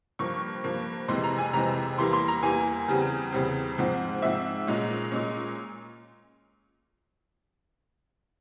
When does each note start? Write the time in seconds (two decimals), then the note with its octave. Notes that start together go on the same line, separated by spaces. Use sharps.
0.19 G2 F3 A#3 C#6
0.64 G2 F3 A#3
1.08 F2 C3 E3 G#3 C4 C6
1.24 A#5
1.38 G#5
1.53 F2 C3 E3 G#3 C4 A#5
1.98 E2 E3 G3 A#3 C6
2.13 C6
2.28 A#5
2.43 E2 E3 G3 A#3 G#5
2.88 E2 C#3 G3 C4
3.32 E2 C#3 G3 C4
3.78 G#2 F3 C4
4.22 G#2 F3 C4 E5
4.67 A#2 G#3 C#4
5.11 A#2 G#3 C#4